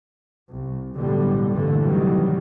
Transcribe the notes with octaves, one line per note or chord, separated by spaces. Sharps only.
C2
B1 A2 D3 G3
A1 G2 A#2 D3 E3 A3
C3 D#3 E3 F#3 G3